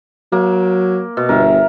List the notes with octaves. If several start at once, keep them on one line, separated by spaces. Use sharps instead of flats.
F#3 A#3
B2
G1 A#4 E5